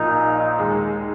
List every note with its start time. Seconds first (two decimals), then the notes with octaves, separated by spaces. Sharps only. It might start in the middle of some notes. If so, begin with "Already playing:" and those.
Already playing: A#1 A#2 A#3 D#4 F4
0.59 D#2 D#3 G#3 D#4